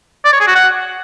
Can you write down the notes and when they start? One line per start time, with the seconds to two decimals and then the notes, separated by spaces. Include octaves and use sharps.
0.25 D5
0.32 C#5
0.40 G#4
0.47 F#4
0.55 F#5